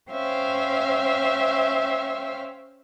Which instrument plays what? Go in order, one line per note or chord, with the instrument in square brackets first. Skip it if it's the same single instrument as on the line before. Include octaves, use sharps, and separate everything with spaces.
[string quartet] C#4 C5 E5 F5 G5